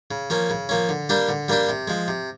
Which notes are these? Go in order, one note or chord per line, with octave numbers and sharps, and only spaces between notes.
C#3
F3 A#3 C#4
C#3
F3 A#3 C#4
D3
G3 A#3 D4 G4
D3
G3 A#3 D4 G4
C3
F3 G#3
C3